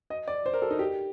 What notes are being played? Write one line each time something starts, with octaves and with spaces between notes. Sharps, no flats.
D#5
D5
C5
A#4
A4
D#4
G4